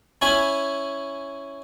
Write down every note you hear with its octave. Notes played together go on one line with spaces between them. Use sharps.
C#4 E4 G#5 B5